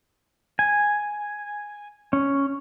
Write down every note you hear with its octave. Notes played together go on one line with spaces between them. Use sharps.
G#5
C#4